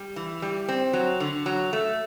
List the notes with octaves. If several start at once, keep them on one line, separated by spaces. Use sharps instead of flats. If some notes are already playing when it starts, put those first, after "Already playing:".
Already playing: G3
E3
G3
C4
F#3
D3
F#3
A3